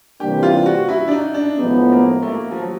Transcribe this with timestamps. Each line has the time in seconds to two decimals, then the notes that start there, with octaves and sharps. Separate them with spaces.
0.20 C3 E3 G3 A#3 D4 G4
0.43 F4
0.66 F#4
0.89 E4
1.08 D4
1.11 D#4
1.34 D4
1.58 A2 F3 G#3 B3 D#4
1.92 A#3
2.22 A3
2.27 A#3
2.51 F3
2.61 F#3